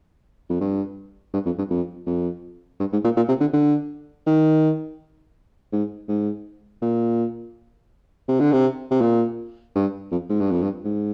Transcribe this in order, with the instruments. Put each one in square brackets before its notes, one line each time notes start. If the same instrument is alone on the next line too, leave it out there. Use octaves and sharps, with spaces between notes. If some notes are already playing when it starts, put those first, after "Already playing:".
[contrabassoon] F2
G2
G2
F2
G2
F2
F2
G2
G#2
A#2
A#2
C3
D3
D3
D#3
G#2
G#2
A#2
C3
D3
C3
C3
A#2
G2
F2
G#2
G2
F2
G2
G#2